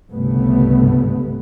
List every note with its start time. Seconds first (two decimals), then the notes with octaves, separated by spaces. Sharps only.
0.11 G1 C2 G2 C#3 A3 B3